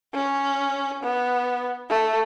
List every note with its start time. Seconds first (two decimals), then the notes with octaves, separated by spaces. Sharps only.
0.14 C#4
1.03 B3
1.90 A3